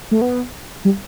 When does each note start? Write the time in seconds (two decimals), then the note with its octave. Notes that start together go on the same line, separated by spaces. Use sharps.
0.11 A3
0.21 B3
0.85 G3